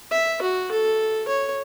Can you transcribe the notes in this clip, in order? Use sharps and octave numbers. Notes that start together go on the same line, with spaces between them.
E5
F#4
A4
C#5